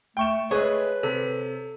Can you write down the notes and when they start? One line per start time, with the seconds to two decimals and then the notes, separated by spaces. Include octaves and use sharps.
0.17 A3 G5 C#6 E7
0.51 G#3 A3 G#4 B4 C#5
1.03 C3 A4